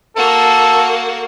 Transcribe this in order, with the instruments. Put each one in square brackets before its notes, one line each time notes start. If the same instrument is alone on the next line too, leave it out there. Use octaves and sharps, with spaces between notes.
[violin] A#3 F#4 [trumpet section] A4